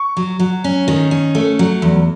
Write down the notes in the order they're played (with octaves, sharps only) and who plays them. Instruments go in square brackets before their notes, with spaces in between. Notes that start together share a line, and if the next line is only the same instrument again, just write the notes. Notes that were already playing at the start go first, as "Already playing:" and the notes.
Already playing: [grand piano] C#6
[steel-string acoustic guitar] F#3
F#3
C#4
D#3
C#4
A3
F#3
E2